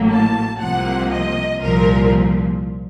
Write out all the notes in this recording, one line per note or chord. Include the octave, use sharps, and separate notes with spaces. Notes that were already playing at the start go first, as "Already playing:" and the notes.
Already playing: A1 A2 F#3 A#3
A5
C2 C3 F3 A#3 F#5
D#5
C2 A#2 F3 A#4